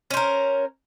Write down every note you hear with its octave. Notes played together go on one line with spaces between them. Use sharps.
C#4 A#4 C5